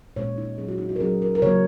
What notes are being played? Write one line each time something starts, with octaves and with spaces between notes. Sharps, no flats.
A#2 G#3 C#4 C#5
D#4
F#3 C#4 G#4
F#4
D#4
F#4
A#4
F#3 C#4 G#4
A#4
A#4
C#3 F#3 A#3 C#5